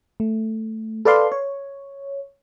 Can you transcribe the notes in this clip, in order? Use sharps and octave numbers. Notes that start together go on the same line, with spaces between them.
A3
A4 B4 D5 F5 C6
C#5